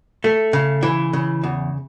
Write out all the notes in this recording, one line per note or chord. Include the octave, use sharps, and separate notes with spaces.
A3
C#3
E3
C#3
E2